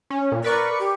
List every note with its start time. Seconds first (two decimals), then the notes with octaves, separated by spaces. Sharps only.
0.10 C#4
0.32 A#2
0.44 A#4 B4 D5 C#6
0.79 G4